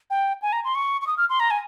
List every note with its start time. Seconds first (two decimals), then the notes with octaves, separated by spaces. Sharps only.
0.10 G5
0.42 G#5
0.52 A#5
0.64 C6
0.75 C#6
1.01 C#6
1.07 D#6
1.17 F6
1.29 C6
1.40 A#5
1.51 G#5